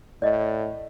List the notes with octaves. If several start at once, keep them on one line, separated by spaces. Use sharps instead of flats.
A2 D5 D#5